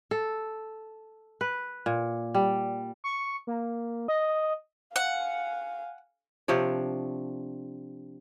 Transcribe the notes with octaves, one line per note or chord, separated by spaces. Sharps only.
A4
B4
A#2
G3
C#6
A#3
D#5
F5 F#5 G#5
C3 F3 D4 C#5